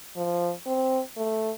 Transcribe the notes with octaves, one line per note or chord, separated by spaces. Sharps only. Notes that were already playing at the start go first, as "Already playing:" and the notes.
F3
C4
A3